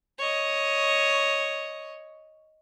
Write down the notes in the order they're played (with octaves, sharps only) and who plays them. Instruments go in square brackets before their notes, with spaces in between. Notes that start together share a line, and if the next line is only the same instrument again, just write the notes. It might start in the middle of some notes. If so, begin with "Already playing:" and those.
[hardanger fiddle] C#5 D#5